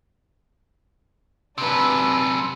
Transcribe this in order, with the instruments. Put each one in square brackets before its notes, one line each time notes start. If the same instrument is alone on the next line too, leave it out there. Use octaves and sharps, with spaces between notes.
[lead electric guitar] F#2 C3 [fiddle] D4 B4 [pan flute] E6